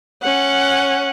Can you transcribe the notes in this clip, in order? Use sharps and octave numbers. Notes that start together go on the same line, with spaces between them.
C#4 F#5